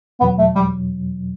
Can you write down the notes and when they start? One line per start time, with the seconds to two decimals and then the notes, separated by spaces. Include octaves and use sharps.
0.20 E2 B2 F#3 B3
0.39 A3
0.55 G3